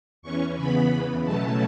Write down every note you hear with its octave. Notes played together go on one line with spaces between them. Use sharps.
E2 E3 C#4 C#6
C#3 E3 B3 B5
E2 C#3 E3
B2 F#3 A3 C#4 A5